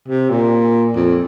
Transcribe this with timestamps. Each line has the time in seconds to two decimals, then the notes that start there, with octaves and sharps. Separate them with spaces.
0.08 C3
0.30 A#2
0.96 F2